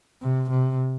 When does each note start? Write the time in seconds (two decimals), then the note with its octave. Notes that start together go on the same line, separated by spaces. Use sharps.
0.22 C3
0.50 C3